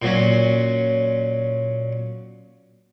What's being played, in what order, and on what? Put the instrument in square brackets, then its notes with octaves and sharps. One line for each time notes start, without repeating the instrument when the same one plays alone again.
[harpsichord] A#2 F#3 C#4